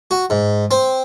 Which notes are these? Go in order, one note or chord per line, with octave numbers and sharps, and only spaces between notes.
F#4
G#2
C4